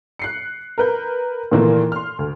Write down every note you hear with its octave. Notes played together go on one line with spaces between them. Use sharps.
F#6 C7 C#7
A#4 B4 G6
A#2 D#3 E3 A3 A#3
C6 F6
D2